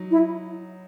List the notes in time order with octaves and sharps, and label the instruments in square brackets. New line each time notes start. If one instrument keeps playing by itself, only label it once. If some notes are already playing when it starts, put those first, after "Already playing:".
Already playing: [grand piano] F#3 D#4
[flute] E4